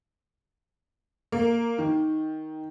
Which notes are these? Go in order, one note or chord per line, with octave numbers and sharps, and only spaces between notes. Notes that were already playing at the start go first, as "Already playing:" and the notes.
A#3
D#3